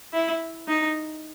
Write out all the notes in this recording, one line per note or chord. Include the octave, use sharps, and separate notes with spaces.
E4
D#4